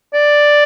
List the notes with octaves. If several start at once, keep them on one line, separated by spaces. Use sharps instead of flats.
D5